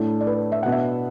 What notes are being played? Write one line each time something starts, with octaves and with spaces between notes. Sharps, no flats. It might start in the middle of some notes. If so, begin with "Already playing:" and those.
Already playing: A2 A3 D4
D5
B4
E5
B2 B3 D4 F#5
E5